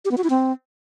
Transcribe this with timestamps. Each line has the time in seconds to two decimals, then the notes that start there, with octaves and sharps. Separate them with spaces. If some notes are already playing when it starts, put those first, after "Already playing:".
0.05 G4
0.11 B3
0.17 F#4
0.24 E4
0.30 C4